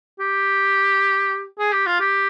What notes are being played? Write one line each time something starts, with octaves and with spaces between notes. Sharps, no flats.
G4
G#4
G4
F4
G4